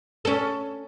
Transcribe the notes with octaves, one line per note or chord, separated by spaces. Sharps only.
C#4 A4